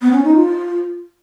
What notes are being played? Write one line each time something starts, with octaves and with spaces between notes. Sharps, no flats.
B3
C#4
D#4
F4